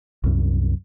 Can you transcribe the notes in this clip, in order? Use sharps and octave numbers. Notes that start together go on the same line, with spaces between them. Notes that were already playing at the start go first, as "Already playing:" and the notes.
C2 F#2